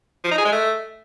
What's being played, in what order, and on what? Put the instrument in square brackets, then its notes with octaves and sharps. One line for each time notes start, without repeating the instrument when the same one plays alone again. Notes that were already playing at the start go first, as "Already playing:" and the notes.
[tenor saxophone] F3
D#4
G#4
G#3
A3